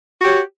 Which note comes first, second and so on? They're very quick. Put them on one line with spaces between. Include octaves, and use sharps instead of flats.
F#4 G4 C#5